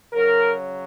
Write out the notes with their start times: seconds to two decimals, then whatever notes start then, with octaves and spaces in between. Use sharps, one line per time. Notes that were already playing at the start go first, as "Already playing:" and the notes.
0.13 C#3 F#3 A#4